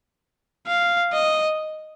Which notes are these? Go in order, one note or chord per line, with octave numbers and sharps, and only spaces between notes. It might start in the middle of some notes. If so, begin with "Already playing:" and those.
F5
D#5